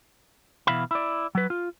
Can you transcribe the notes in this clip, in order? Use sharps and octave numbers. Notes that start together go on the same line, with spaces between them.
B2 E3 E5 F5 B5
E4 D5
F#3 B4
F4